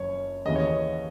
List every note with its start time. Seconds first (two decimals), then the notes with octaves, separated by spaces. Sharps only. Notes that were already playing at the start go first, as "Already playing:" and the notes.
Already playing: F#1 F#2 C#5
0.45 D#2 C#3 E3 A#3 D#5
0.56 C#5
0.67 D#5